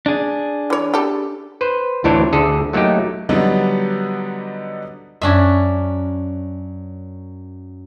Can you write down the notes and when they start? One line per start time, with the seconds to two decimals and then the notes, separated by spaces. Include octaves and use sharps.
0.06 D4 G#4
0.70 E3 C#5
0.94 G4 A4
1.61 B4 C5
2.04 D2 A2 E3 D4 C5 C#5
2.33 D2 D3 G#4 A4
2.73 F#3 A3 A#3 D#4 G4
3.29 D3 F#3 G3 B3 D4 D#4
5.22 F#2 C#4 D4 E5